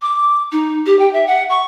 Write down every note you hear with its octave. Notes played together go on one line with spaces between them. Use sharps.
D6
D#4
G4
G5
E5
F#5
C#6